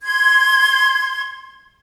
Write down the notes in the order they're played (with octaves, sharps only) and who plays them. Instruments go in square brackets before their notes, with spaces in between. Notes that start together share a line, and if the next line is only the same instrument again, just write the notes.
[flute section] C6 G#6